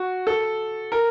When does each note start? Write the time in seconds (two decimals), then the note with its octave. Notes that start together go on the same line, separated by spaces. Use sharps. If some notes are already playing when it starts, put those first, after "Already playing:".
Already playing: F#4
0.27 A4
0.92 A#4